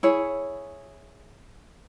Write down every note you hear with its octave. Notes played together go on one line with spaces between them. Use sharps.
E4 G#4 C#5